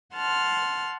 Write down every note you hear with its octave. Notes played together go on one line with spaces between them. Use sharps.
F#5 A5 C6 F6